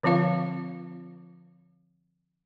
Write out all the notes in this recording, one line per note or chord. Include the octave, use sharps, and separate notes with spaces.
D3 F3 C4 F4 F5